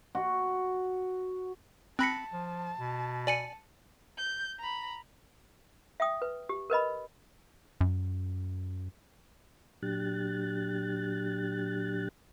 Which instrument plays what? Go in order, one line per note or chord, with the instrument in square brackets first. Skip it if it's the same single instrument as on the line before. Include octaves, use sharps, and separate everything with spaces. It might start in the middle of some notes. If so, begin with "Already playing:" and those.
[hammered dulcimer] F#4
[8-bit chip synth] C4 B5 B6 [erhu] A5 [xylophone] F#6 A#6 C#7
[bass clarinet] F3
B2
[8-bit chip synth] D5 G#5 [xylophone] C#7 D#7 F#7
[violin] G6
A#5 B5
[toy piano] E5 G5 D#6
B4
G4
A#4 B4 D#5 B5
[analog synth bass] F#2
[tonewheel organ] A#2 F#3 D4 G4 F#6 A6